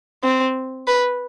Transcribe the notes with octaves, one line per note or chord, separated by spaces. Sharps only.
C4
B4